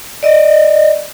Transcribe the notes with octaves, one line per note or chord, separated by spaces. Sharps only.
D5 D#5